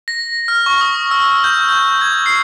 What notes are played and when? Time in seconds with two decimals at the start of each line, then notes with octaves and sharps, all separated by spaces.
0.08 A#6
0.48 F6
0.66 C#6
0.81 D#6
1.11 E6
1.44 G6
1.69 G6
2.01 G#6
2.26 C7